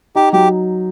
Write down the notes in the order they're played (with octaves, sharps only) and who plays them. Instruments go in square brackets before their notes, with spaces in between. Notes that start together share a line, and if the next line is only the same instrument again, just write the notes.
[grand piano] D#4 [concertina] G4
[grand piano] F#3 [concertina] G4